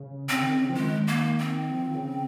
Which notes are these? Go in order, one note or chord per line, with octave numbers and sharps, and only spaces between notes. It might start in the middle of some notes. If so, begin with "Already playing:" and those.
Already playing: C#3
C#3 C4
D#3
C#3
F3
D#3 G#3
A#3
C4
F3
D#3
C#3